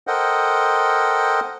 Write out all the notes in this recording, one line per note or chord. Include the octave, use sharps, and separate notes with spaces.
A4 A#4 C5 D#5 F#5 G5